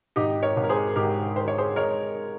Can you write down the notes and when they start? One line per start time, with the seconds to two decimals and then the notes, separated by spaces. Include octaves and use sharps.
0.16 G#1 D#4 G4
0.43 A#4 C#5
0.57 G#1
0.64 A#4
0.69 G#4 C5
0.96 G#2 G4 A#4
1.36 D#3 C5
1.48 C#5
1.58 G#4 C5
1.76 G#3 A#4 C#5